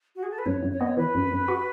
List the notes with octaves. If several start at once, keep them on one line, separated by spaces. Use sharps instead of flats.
F#4
G#4
A4
B4
F#2 C#5
F#2
C#5
B3 D#5
C#5
E3 B4
F#2
F#2
F#4